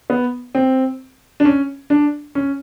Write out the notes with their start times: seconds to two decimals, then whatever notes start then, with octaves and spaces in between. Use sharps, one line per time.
0.10 B3
0.55 C4
1.40 D4
1.45 C#4
1.90 D4
2.35 C#4